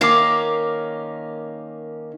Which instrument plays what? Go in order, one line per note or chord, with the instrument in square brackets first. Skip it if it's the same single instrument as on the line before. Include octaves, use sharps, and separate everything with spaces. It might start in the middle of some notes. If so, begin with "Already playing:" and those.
[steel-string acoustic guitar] D#3 A#3 C#4 [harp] D6 C7